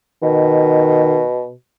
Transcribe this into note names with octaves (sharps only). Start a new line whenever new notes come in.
B2 D#3